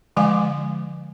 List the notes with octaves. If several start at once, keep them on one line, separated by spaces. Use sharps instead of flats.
D3 F3 G#3 F5 G#5 D6